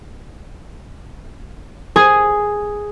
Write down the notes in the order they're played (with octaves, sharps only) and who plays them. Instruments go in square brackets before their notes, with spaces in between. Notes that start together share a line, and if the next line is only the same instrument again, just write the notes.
[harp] G#4